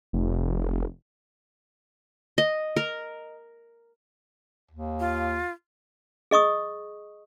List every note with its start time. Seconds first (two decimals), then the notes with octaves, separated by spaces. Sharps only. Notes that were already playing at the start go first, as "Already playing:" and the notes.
0.13 F1
2.38 D#5
2.77 A#4
4.71 D#2
5.00 F4
6.31 G#4 D#5 C#6 D#6